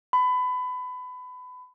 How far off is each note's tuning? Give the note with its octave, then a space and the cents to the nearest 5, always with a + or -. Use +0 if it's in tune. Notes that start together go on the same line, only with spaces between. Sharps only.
B5 +25